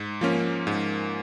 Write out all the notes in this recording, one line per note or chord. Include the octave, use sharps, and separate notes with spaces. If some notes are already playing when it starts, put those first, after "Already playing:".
Already playing: G#2
F3 A#3 C#4
G#2